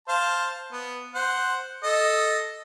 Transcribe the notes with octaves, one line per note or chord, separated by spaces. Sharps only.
C5 F5 A5
B3
C5 F#5
A4 D#5